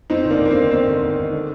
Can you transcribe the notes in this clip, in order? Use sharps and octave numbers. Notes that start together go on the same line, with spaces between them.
F2 C4 D#4
G1
A#3 D4
G1 A#3
C4
D#3
F2 C4
G1
G1
D#3
D3